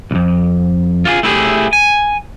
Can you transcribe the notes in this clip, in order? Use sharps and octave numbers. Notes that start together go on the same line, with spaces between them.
B1 F2
F4 F#4 G#4
A3 E4 G4 G#4
G#5